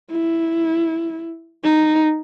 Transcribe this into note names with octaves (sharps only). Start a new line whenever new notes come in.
E4
D#4